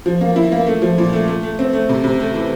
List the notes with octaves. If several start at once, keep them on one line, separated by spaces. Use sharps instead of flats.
F3
A#3
E4
A#3
A3
F3
A#2
A3
A3
A3
C4
A3
C3
C3
A3
E3